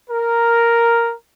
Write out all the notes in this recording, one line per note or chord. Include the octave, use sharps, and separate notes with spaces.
A#4